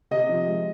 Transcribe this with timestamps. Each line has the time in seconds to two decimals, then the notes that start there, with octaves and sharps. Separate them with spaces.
0.11 C3 D#5
0.29 F3
0.47 G#3